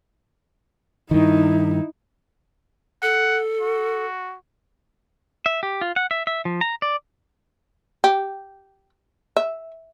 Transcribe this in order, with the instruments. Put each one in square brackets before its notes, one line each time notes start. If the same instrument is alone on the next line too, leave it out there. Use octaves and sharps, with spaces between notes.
[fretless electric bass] G2 D#3 [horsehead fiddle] D#4 E4
[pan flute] A4 [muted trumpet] F#5
[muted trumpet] F#4
[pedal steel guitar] E5
G4
F4
F#5
E5
E5
F3
A#5
D5
[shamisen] G4
E5